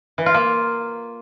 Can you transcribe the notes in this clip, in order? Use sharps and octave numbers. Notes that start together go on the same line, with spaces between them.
E3
F4
A#3